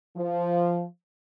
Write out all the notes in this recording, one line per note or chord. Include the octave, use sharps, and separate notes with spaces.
F3